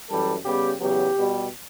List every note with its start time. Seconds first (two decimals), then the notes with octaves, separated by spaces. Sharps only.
0.09 F#2 E3 G3 A4
0.43 C#3 G3 B3 G4
0.80 E2 C#3 F#3 B3 G4
1.16 B2 G3 B3